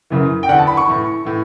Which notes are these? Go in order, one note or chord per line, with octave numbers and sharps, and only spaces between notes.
F#2 C#3 E3
G5
E2 D3 F#5
A5
B5
C#6
A2 E3
A2 E3